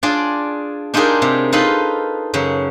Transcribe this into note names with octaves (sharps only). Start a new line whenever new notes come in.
D4 F4 G#4 D5
D4 D#4 F4 G4 G#4 A#4
C3
D#4 F4 A4 B4 F5 B5
F#2 C#3